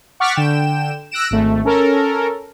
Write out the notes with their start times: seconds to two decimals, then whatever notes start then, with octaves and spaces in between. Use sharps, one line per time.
0.20 F#5 C#6 D6 F6 A6 B6
0.36 D3 G5 E7
1.11 E6 F#6 A#6 D7 E7
1.31 G#1 A3
1.65 C#4 A4 A#4